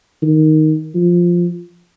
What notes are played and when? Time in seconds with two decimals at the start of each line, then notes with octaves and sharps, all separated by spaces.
0.22 D#3
0.95 F3